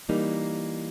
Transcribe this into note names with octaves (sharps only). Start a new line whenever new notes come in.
E3 G3 A#3 D#4